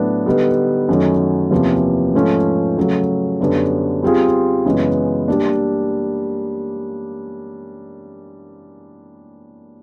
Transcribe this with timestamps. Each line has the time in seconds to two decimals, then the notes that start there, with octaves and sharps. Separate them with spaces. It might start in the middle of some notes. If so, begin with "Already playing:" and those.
Already playing: A2 F#3 B3 D4
0.26 D3 G3 B3 D#4
0.89 F#2 D#3 F#3 A3 C#4
1.51 E2 C3 F3 A#3 C#4
2.14 G#2 F3 A3 C#4
2.77 C#3 F#3 A3
3.40 F#2 D3 G3 B3 D4
4.03 G3 C4 F4 G#4
4.65 F#2 C#3 E3 G#3 B3
5.28 G3 A#3 D4